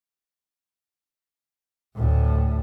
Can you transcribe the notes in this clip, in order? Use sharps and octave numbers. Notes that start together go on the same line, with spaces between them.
D2 A2